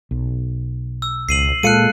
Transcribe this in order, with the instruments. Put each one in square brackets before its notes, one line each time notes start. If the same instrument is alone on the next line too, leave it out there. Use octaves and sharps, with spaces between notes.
[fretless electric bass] B1
[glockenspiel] E6
[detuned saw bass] C#2 [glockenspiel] C7 D#7 F#7
[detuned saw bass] A#2 [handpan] G#3 A4 F5 [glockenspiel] F#6 C#7 D#7